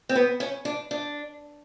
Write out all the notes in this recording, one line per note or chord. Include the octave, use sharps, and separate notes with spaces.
C4
B3
C#4
D4
D4